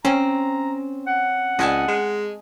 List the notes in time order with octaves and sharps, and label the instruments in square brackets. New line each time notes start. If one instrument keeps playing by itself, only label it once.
[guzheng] C4 [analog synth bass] C#4 [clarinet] A#5
[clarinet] F#5
[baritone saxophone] C#2 [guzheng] D#5 G#5 A5
[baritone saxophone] G#3